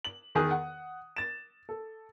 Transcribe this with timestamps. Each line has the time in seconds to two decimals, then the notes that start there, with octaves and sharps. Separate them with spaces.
0.04 F#7
0.35 E2 D#3 G#4 D#6 F#6
0.51 F#5
1.16 A6 E7
1.69 A4